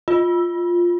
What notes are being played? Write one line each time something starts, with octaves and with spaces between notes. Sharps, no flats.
F4